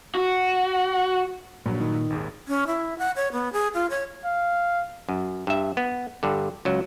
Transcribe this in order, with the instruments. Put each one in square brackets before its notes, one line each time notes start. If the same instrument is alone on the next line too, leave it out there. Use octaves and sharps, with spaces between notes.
[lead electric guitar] F#4
[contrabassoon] A#1 [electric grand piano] G2 F#3 [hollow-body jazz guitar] A#2
[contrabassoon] D#3
[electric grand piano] G#1 D#2 G#4
[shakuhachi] C#4
E4
F#5
C#5
B3
G#4
F4
C#5
[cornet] F5
[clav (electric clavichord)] F#2
G2 E5
B3
G2 D3
C#2 F#3